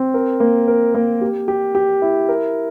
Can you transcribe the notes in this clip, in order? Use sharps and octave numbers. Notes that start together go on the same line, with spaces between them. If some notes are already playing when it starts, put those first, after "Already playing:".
Already playing: C4
A#4
A#3
A#4
A#3
G4
G4
G4
E4
A#4